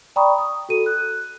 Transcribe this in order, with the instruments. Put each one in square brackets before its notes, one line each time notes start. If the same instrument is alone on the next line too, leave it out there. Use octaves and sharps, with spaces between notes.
[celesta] D5 G5 A#5 B5 C#6 D#6
D#6
F#4 A4 D#7
F#6